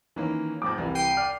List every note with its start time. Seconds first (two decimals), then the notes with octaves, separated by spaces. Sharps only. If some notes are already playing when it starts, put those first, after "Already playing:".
0.16 D#3 E3 A#3 C#4
0.62 F2 G#2 F3 D6
0.78 C2 E3 G3
0.95 G5 C7 D#7
1.17 D5 F6